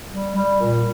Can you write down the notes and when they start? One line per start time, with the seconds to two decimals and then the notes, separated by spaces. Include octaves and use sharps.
0.10 G3
0.35 G3
0.60 A#2